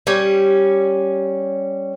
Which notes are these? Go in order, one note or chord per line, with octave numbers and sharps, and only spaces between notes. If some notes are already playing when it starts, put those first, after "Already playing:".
G3 C#4